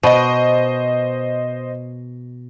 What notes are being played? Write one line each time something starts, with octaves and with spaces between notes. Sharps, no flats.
B2 C5 D#5